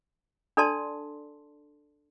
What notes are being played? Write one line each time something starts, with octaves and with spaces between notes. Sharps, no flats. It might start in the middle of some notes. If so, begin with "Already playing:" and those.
D4 A4 D5 A5 C6